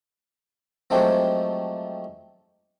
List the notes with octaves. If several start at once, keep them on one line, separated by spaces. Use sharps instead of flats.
F3 F#3 G#3 A3 C4 G4